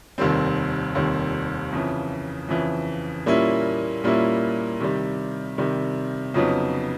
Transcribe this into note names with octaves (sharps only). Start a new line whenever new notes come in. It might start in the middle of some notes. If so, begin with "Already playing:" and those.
F1 D#2 D#3 G3 C4
F1 D#2 D#3 G3 C4
F2 C#3 E3
F2 C#3 E3
A#2 G3 A#3 C#4 E4
A#2 G3 A#3 C#4 E4
C3 D#3 G3
C3 D#3 G3
F2 C#3 F#3 B3 D#4